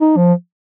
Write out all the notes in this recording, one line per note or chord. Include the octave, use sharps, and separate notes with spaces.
D#4
F3